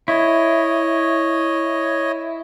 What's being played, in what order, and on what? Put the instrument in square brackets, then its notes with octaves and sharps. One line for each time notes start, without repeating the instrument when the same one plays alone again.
[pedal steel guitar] E4 [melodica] C#5 D#5